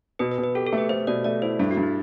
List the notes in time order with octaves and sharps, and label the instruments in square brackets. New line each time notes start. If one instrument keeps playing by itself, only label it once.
[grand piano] B2 [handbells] B4
[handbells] B4
[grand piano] B2
[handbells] B4
[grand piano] G4 [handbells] A4
[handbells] A4
[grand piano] A3
[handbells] B4
[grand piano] A3 [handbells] C5
[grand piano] B2 [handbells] D5
[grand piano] A3 [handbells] D5
[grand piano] E4 [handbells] C5
[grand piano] G2 [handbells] A4
[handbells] F#4
[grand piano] G2
[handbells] E4